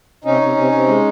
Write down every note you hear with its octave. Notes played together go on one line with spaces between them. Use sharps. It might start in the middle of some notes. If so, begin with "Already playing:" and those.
C3 C#4 D#4
C3
C3
C3
G#3